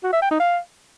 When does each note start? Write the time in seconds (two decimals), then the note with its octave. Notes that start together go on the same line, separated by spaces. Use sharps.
0.04 F#4
0.13 E5
0.22 G5
0.31 D#4
0.40 F5